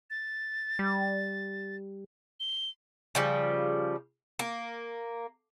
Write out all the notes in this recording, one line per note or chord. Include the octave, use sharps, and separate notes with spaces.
A6
G3
G7
C#3 F3 G3
A#3